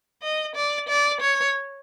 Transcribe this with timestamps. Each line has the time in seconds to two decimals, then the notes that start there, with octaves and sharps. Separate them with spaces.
0.22 D#5
0.56 D5
0.89 D5
1.21 C#5